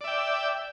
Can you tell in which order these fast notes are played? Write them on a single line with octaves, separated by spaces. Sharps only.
D5 E5 G5